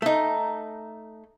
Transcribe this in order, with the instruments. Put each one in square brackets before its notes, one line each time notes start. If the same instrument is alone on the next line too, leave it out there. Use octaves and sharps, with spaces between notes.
[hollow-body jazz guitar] A3 D#4